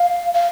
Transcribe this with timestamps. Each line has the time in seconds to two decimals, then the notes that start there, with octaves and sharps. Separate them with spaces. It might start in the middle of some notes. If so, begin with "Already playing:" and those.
Already playing: F5
0.34 F5